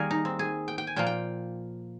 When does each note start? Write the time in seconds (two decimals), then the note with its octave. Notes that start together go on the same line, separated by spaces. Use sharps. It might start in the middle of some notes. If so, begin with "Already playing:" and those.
Already playing: D#3 G3 A#3 G#4 A#4
0.11 D#4
0.25 C4
0.39 G#4
0.68 G5
0.78 G5
0.87 G#5
0.96 A#2 F3 A#3 G5
1.07 G5